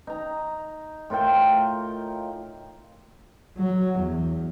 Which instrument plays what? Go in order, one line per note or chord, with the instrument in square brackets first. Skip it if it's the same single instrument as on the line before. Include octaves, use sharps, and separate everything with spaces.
[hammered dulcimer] D#4 A#5
A2 F4 A#4 G5
[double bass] F#3
E2